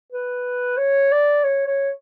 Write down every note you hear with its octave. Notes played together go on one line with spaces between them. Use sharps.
B4
C#5
D5
C#5
C#5